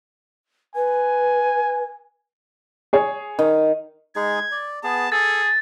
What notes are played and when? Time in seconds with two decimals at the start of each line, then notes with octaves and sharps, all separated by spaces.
0.76 B4 G#5
2.93 G#4 C#5
3.39 D#3
4.16 G#3 D#4 G#4 G#6
4.51 D5
4.84 B3 G#4 A5
5.12 G#4 A4 A6